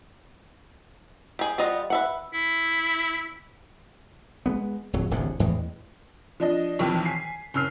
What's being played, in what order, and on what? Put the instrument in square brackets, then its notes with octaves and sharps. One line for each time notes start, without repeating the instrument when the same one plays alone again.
[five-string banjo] G4 G#4
G3 F4 D#5 F#5
B4 E5 F#5
[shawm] E4
[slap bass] G#3 A#3 B3
D1 F2 F#3
D1 A1 F2 D3
E2 A2 E3 G#3
[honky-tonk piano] F3 D4 D#5
B1 F2 D#3 E3
G#5 B6 C7
F#1 C#4 E6 F6 C7